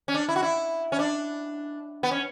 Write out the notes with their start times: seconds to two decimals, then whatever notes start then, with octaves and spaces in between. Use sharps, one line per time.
0.08 C#4
0.14 D4
0.29 E4
0.36 F#4
0.43 E4
0.92 C#4
0.99 D4
2.03 B3
2.11 C#4